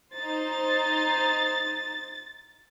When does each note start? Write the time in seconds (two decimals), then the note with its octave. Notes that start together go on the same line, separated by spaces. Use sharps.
0.15 D#4 C5 A6